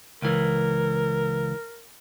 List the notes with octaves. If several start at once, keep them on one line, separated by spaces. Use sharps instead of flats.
C#2 E3 A#4